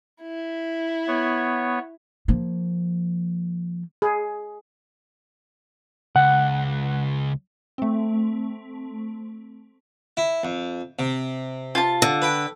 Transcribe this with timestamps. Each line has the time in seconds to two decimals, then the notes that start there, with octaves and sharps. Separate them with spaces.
0.22 E4
1.07 B3 C#5
2.28 F3 A#3
4.02 G#4
6.16 C#2 F#5
7.78 A3 C4
10.17 E4
10.43 F2
10.99 C3
11.75 F4 A5
12.02 D3
12.22 B4 G5